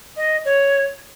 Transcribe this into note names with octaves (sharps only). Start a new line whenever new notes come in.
D#5
C#5